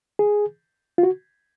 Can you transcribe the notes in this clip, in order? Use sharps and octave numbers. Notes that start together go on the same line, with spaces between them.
G#4
F4
F#4